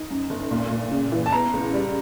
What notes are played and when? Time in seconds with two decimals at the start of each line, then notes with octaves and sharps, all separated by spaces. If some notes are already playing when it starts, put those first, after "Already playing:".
Already playing: D#4
0.10 F#2
0.30 G1
0.51 A#2
0.71 A#2
0.91 C#3
1.12 E3
1.26 A5
1.32 B3 A#5
1.53 C#2
1.73 G3